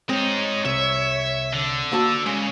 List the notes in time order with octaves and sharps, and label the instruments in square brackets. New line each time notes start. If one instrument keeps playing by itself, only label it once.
[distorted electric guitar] G#3 D#4 [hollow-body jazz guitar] C4 [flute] C#5
[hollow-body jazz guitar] C2 [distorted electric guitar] E5
[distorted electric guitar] D3
[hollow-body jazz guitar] A#3 F#4 A5 [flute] E6
[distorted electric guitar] C#3 [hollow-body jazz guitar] G#3 [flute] G#5